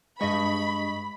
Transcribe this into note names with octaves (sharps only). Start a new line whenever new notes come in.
G2 G#3 D#5 B5 C#6